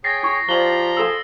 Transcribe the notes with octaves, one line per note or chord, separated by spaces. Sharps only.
G#4 C#5 G5 A6 A#6 C7
E4 C#6
F3 F4 G4 C5 D5 A#5 F#7 G7
F4 G#4 A4 C5 F5 A5 E6